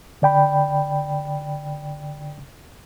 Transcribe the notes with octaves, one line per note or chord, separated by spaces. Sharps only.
D3 D5 G5 B5